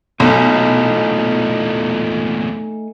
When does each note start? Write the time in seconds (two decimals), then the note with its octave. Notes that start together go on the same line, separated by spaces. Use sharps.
0.20 B1 E2 A#2 A3 D#4 G#4